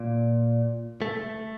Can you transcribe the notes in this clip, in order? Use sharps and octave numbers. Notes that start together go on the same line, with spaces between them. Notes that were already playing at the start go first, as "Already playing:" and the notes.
Already playing: A#2
A3